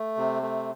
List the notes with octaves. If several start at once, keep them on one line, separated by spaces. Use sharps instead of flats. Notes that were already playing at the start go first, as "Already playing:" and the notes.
Already playing: A3
C3
A3